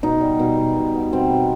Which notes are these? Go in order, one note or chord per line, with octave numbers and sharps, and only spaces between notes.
B2 D#4
G3
B2
B2
B2
B3
B2 C4
B2